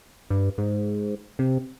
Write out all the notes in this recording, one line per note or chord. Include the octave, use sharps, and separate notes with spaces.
G2
G#2
C3